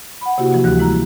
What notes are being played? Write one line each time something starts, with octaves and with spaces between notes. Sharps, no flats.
F#5 B5
C3 A#3 E4 F#4 G4
E3 F3 A#3 F#4
D2 E3 F3 G3 G4 F#6
G#3 E4 A#5